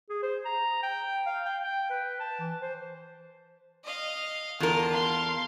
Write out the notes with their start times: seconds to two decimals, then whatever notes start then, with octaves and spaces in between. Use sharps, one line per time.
0.10 G#4
0.22 C5
0.45 A#5
0.83 G5
1.26 F5
1.46 G5
1.64 G5
1.90 B4
2.20 A5
2.40 E3
2.62 C5
3.84 D#5 F5
4.60 E2 F4 A#4 A5
4.93 F5 C6